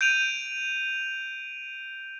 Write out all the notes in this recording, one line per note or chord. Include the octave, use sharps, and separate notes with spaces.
G6 D7 D#7 F7